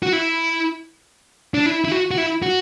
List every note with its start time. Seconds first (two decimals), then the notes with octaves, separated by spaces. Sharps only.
0.03 F#4
0.13 E4
1.54 D4
1.66 E4
1.85 E4
1.92 F#4
2.11 F#4
2.18 E4
2.42 F#4